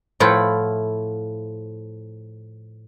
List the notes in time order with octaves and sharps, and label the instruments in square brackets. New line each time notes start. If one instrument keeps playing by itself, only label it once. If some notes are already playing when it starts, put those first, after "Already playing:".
[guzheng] A2 F3 E4 F4 F#5 G5